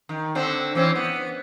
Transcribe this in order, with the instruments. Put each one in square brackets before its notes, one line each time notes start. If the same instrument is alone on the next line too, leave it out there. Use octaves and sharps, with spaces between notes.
[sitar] D#3
D3 C4 D4
E3 C4 C#4
B3